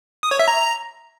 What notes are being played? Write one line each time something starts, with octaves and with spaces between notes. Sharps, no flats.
D#6
C#5
E5
A#5